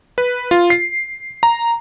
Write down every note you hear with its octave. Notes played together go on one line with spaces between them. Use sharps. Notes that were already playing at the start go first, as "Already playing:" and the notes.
B4
F4
C7
A#5